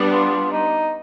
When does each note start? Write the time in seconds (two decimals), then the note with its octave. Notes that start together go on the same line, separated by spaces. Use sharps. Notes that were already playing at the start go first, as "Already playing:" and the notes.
Already playing: G3 B3 D4
0.12 F4
0.51 D#4